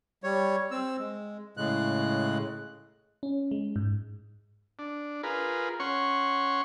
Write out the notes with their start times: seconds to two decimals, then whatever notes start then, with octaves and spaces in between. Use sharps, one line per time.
0.24 G3 C#5
0.71 C4 E6
0.99 G#3
1.57 A2 C#3 G#3 F#6
3.23 C#4
3.51 G#3
3.76 G#2
4.79 D4
5.23 F4 G#4 A#4 B4
5.80 C#4 C#5 F#5 C6 C#6